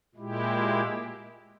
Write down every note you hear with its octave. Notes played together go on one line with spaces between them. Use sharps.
A#2 G#3 E4 G4